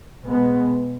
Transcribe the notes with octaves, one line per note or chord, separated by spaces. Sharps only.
B2 G#3 B3